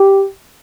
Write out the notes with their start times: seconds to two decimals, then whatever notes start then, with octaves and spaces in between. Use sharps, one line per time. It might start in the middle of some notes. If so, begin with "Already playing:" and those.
Already playing: G4